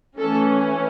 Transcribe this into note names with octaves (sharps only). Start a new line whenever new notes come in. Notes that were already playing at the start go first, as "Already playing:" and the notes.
E3 A3 C#4 A4